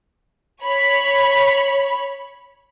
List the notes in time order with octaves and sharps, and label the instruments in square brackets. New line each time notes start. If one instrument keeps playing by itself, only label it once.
[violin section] C#5 B5